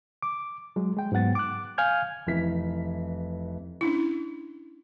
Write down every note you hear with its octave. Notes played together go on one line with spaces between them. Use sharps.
D6
F#3 G#3
G#3 G5
G#2 F#3 B3 F#5 A6
D6 F#6
F5 G#5 F6 G6 G#6
F1 E3 B6
C#4 D4 E4